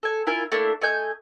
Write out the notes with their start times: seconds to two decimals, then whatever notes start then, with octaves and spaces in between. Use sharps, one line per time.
0.03 A4 G#5
0.27 E4 F4 A#4 G#5
0.52 A3 A#3 D4 E4
0.81 A3 D#5 G#5 G6